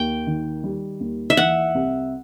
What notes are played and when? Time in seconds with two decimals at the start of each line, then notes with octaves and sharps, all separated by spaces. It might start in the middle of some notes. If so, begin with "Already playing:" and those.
Already playing: D#2 G5
0.27 D#3
0.64 G3
1.01 D#2
1.30 E5
1.37 E3 F#5
1.75 C2